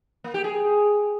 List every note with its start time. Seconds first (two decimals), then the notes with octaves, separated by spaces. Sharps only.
0.24 A#3
0.34 G4
0.44 G#4